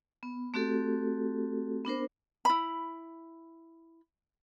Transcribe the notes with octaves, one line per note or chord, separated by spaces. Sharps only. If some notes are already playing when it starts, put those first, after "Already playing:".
B3
A3 C4 F#4 G4 A4
B3 D4 A#4 C5
E4 B5